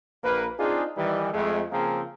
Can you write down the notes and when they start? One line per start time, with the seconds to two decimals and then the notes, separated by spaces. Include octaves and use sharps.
0.24 A#1 A#3 B4
0.59 C4 D4 D#4 F4 G#4
0.97 D#3 E3 G3
1.33 F2 G#3 A3
1.72 C#3 F3 A#3 C4 G#4 A#4